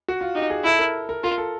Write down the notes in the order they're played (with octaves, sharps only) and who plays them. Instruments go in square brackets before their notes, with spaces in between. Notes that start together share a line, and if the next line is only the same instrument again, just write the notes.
[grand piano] F#4
F4
[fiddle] D#4 [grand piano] G4
[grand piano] G#4
[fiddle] E4 [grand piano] A4
[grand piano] A#4
A#4
[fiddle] F4 [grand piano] A#4
[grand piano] A4